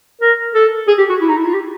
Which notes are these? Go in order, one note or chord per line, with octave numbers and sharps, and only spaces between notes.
A#4
A4
G#4
G4
F#4
E4
D#4
E4
F4
G4